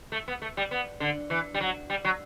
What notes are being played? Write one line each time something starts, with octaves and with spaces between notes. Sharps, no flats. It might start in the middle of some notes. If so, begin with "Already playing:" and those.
A3
B3
A3
G3
B3
D3
E3
G3
F#3
G3
F#3